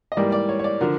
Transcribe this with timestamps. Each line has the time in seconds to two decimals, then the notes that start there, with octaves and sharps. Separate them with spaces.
0.12 D#5
0.17 G#2 E3 G3 A#3 D5
0.32 D5
0.49 C#5
0.59 C#5
0.64 D5
0.81 D3 F3 A#4